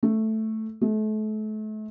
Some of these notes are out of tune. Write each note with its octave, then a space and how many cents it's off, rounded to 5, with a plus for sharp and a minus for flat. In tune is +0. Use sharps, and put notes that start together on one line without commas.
A3 +0
A3 -35